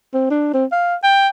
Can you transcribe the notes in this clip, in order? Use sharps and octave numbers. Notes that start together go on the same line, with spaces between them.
C4
D4
C4
F5
G5